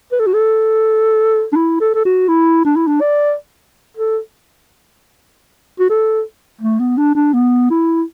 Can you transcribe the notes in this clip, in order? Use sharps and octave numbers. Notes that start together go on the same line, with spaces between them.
B4
A4
F#4
A4
D4
E4
A4
A4
F#4
E4
D4
E4
D4
D5
A4
F#4
A4
A3
B3
D4
D4
B3
E4